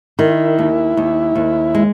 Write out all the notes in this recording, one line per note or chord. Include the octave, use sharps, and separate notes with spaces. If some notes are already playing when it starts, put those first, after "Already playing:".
D#3 E4
D#2
D#2
D#2
G#3